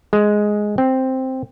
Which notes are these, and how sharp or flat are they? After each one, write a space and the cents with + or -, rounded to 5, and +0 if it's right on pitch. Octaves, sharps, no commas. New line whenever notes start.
G#3 +5
C4 +0